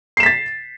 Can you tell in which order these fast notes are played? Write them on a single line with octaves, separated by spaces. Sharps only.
C7 E7 B6 A6